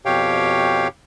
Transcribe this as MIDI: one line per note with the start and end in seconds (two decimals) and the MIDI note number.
0.06 0.88 41
0.06 0.88 47
0.06 0.88 67
0.06 0.88 73
0.06 0.88 77
0.06 0.88 79